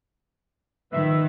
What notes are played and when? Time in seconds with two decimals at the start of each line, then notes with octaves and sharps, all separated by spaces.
0.93 D#3 F3 B4 E5